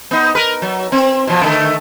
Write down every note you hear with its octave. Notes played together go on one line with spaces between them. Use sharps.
B3 D#4
A#4 B4
F#3
C4
B2 F3
D3 D#3 A3